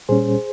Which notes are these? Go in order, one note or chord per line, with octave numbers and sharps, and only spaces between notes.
A#2 G3 C#4 G#4 C5